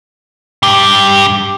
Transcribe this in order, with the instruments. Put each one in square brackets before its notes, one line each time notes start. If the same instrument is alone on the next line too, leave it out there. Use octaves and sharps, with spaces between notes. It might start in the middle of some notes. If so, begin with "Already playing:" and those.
[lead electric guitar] G2 G4